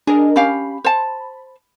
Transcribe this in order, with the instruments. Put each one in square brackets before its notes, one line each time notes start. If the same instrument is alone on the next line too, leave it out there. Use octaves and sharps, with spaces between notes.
[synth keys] D4 A#4 D#5 [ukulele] G#4
[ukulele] C#4 G4 F5 [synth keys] B5
[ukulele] C5 A5